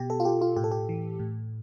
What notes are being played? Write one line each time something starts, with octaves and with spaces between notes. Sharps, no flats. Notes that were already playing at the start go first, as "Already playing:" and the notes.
Already playing: B2 G4
A4
F4
G4
F4
A2 G4
A4
G4
E3
A2